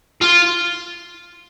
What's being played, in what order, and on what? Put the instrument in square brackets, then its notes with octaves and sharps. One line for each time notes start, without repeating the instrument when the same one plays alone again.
[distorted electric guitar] F4